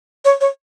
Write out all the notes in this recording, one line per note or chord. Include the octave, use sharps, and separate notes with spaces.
C#5
C#5